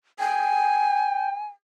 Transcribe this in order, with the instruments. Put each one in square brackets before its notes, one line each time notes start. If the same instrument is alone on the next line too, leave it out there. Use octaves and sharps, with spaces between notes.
[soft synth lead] G5 [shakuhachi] G#5